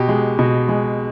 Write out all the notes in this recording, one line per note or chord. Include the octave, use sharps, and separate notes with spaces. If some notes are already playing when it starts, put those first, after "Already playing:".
Already playing: B2 G4
G#3
B2
G#3